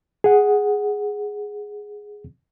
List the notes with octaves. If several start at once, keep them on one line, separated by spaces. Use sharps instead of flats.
G#4 F#5